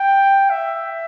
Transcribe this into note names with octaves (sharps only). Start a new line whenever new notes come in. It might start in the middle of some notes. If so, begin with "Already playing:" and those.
Already playing: G5
E5